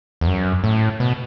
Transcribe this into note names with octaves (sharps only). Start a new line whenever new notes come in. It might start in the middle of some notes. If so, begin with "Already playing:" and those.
E2
F#2
A2
B2